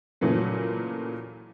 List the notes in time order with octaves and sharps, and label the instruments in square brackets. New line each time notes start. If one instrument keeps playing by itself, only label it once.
[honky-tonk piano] A#2 C#3 E3 F#3 A3